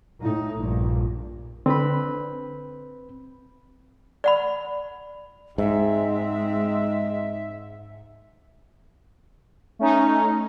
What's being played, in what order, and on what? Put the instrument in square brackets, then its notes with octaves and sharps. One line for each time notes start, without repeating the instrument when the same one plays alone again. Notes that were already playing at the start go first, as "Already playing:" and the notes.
[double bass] A2 D#4
A#1 G2
[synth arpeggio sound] D3 D4 [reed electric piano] C4 B4 B5
[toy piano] D5 F#5 B5
[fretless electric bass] G#2 [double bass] G#3 C4 [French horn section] D#4 D#5 [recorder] E5
[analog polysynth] A3 C#4 D#4